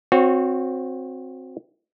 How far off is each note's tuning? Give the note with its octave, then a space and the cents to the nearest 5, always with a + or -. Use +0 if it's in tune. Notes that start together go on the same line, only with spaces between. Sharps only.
C4 +0 F#4 -25 C#5 +0